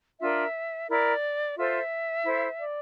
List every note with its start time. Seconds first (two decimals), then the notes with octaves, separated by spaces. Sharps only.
0.21 D4 F4 A#4 E5
0.89 E4 A#4 D5
1.57 F4 A4 C5 E5
2.24 E4 A4 C5
2.59 D5